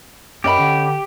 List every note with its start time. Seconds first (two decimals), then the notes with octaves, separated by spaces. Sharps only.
0.44 F#2 C#4 G4 D#5 B5
0.59 D3